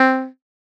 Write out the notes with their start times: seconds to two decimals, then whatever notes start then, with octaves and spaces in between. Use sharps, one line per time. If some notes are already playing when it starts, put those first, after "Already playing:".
Already playing: C4